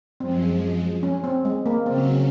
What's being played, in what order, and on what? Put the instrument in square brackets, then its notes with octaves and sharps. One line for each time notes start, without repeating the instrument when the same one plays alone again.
[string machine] F#2 F3 G#3 [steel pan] C4
[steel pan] C#4
C4
G#3
A#3
[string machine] C#3 F#3 C#4 [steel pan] C4